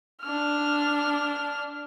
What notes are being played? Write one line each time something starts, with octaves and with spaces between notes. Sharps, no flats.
D4 F6